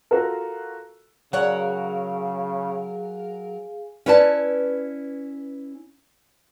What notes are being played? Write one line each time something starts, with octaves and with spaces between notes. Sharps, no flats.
F4 F#4 A4 A#4
C#3 F#3 G#4 A#4 C#5 F5 F#5 G#5
C#4 E4 B4 D5 A5